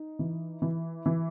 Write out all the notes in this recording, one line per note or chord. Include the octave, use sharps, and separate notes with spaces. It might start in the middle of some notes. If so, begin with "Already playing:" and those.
Already playing: D#4
E3
E3
E3